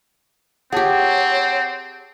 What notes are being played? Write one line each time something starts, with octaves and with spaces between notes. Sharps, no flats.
C4 G4 G#4 C#5 F#5 A5 D6